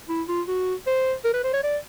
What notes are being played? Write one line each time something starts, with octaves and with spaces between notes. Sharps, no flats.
E4
F4
F#4
C5
A#4
B4
C5
C#5
D5